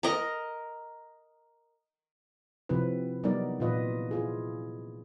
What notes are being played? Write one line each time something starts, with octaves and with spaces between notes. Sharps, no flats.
A#4 D#5 A#5
C3 F3 C4 E4 B4
F#3 G3 B3 D#4 A#4 D5
A#2 E3 F4 B4 D#5
E4 F4 G#4